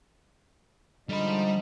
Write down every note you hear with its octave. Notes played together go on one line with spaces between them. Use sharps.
D3 F3 G3 G#3 D#4 B5